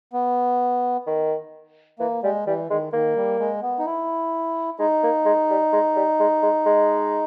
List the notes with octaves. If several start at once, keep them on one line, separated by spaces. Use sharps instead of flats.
B3
D#3
E3 A#3
G3 G#3
E3 G3
D#3 G#3
D#3 A#3
G3
G#3
B3
D#4
E4
G#3 D#4
A#3
G#3
G3
G#3
G3
G#3
G#3
G#3